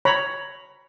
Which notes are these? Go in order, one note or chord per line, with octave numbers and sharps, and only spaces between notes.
C#5 A#5 B5